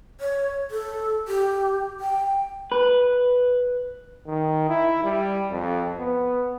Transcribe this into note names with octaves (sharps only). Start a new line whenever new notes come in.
C#5
A4
G4
G5
B4
D#3
E4
G3
F2
B3